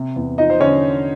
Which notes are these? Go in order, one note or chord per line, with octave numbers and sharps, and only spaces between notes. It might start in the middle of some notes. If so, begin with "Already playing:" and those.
Already playing: C3
E2
F3 D#4 D#5
C5
D3 C#4 C#5